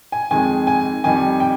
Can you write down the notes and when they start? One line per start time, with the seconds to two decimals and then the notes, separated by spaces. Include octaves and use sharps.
0.12 G#5
0.31 F2 D#3 G#3 G#5
0.67 G#5
1.04 F2 D#3 G3 G#5
1.40 G5